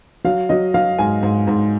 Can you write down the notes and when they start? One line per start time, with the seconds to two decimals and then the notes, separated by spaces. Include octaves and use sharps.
0.24 F#3 F5
0.49 F#3 D#5
0.74 F#3 F5
0.98 G#2 G#5
1.23 G#2
1.47 G#2